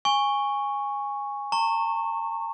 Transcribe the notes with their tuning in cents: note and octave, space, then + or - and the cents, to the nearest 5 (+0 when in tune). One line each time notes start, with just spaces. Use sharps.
G#5 -10 C#6 +0
A#5 -40 C#6 -20